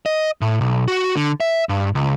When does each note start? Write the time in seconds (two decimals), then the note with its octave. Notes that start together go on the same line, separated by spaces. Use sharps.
0.06 D#5
0.41 A2
0.61 B1
0.88 F#4
1.16 D3
1.40 E5
1.69 G2
1.95 C#2